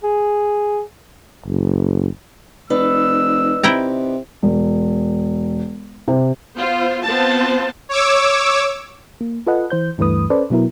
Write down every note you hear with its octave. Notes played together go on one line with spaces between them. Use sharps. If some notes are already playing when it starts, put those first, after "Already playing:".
G#4
F#1
F1 D#4 B4 D5 E6
C3 E4 G5 A#5
E1
C3
B3 F4 C5
B3 C4 F4 C5 A5
C#5 D6 E6
A#3
F4 A4 B4 D#5 F#5
E3 C5 G6
D2 G2 E3 A3 B4 D#6
C#4 A4 B4 C5 D5
B2 F#3 B3 E4 A#4